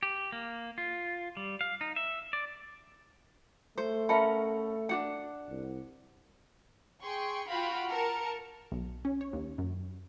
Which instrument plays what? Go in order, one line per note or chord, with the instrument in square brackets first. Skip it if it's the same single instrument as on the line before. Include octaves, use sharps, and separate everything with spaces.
[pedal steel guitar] G4
A#3
F4
G3
F5
D#4
E5
D5
[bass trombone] A3 [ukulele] C5
[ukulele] C#4 A#4 F#5 [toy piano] E5 A5 B5
[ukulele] D4 F#4 F#5
[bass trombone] C2
[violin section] G#4 G5 C6 C#6
F4 F#4 F5 G5 B5
A#4 A5 C#7
[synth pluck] B1
C#4
C#5
D#2
F#2